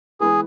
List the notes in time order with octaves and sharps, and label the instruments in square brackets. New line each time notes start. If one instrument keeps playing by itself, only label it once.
[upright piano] E3 G#3 B3 [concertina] G#4